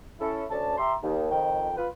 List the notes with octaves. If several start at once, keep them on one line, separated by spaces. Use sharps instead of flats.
C#4 E4 A4
D2 C#4 D5 A5
G4 E5 A#5 C6
D#2
F2 D#3 G5
F4 B4